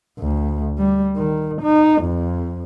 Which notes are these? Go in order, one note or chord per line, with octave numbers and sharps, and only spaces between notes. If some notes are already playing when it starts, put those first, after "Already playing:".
D2
G3
D#3
D#4
F2